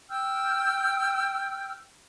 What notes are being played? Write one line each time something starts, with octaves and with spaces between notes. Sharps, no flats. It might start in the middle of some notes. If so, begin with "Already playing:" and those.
G5 E6 F6 G6